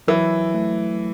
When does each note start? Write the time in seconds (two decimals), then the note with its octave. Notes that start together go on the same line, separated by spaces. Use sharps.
0.08 E3 F#3
0.55 A3